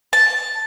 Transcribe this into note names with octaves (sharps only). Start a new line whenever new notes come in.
A5